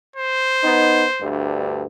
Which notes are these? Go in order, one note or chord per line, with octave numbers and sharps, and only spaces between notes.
C5
B3 D#4
D2 G2